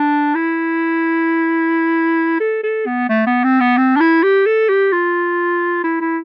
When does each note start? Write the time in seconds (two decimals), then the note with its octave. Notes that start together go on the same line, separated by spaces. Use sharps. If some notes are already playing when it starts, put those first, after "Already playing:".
Already playing: D4
0.35 E4
2.40 A4
2.64 A4
2.86 B3
3.09 A3
3.27 B3
3.44 C4
3.61 B3
3.78 C4
3.96 D4
4.00 E4
4.23 G4
4.46 A4
4.69 G4
4.93 F4
5.84 E4
6.00 E4